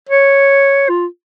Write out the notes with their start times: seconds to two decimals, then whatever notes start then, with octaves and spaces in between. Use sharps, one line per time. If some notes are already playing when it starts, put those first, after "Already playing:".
0.09 C#5
0.89 F4